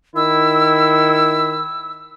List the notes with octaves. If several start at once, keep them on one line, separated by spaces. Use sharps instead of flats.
D#3 E4 E6